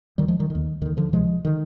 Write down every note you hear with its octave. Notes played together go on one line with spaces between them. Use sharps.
D#2 D3 D#3 G3
F3 G#3
D#3 G3
D#2 D3 D#3
D#2 D3 D#3
D3 F3
D2 C3 F3 G#3
D3 D#3